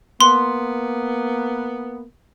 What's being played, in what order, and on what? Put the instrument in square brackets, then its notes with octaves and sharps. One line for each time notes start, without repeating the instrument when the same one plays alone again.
[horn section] A#3 B3 [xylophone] C6